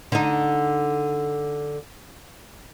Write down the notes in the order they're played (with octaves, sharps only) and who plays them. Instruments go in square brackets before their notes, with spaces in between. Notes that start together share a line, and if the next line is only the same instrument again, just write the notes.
[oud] D3 D#4